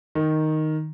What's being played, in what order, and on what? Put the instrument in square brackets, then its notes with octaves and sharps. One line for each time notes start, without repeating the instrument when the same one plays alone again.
[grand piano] D#3